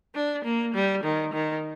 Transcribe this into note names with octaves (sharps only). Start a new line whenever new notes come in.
D4
A#3
G3
D#3
D#3